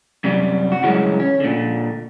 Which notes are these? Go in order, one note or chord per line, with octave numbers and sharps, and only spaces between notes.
F#2 C3 G3
F#4
G2 C#3 E3 F#3 G#3 C#4
C#4
A#2 D3